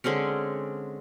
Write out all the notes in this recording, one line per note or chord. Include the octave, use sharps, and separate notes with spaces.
D3 G#3 C4 C#4